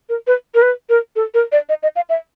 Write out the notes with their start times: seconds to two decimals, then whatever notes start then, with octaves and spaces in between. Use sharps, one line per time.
0.09 A#4
0.27 B4
0.55 A#4
0.62 B4
0.89 A#4
1.16 A4
1.34 A#4
1.52 D5
1.69 D#5
1.83 D#5
1.96 F5
2.09 E5